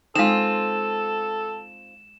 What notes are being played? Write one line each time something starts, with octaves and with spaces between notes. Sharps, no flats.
G#3 C4 D#4 F4 A4 E7